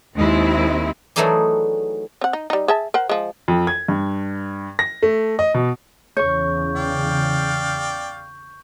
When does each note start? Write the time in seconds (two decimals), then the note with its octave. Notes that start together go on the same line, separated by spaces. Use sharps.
0.16 D#2 G#3 C4 E4
1.16 E3 F#3 A3 D#4 G#4 D5
2.21 C4 F#5
2.33 D#4
2.50 G3 D#4
2.68 G#4 E5 A5
2.94 A#4 C5 F#5
3.09 F3 G#3
3.48 F2
3.67 G#6
3.88 G2
4.79 A#6
5.03 A3
5.39 D#5
5.54 B2
6.17 E2 C#3 C#5 C#6 G6
6.76 D5 F5 G5